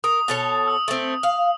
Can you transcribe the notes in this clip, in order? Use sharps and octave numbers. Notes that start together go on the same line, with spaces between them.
A#4 D#6
B2 A4 C#5
E6
A3 C4
F5